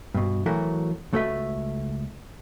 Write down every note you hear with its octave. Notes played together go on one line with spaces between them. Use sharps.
G2 B2
E3 F#3 A3 F#4 A#4
C#2 A3 F#4 A4 B4 E5